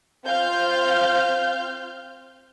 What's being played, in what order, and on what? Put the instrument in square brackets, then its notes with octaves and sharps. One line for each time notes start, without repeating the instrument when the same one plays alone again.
[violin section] C4 F4 F5 F6 G6